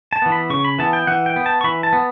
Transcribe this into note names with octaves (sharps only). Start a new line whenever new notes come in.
A5
E3 B3
B5
C#3 C#6
B5
E3 B3 A5
G5
E3 F#5
G5
B3
A5
C#6
E3 B5
A5
B3